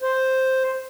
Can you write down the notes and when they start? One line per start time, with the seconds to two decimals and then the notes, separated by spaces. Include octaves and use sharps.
0.02 C5